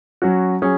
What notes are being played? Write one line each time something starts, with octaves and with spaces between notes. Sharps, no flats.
F#3 C#4 F#4
F#3 C#4 G#4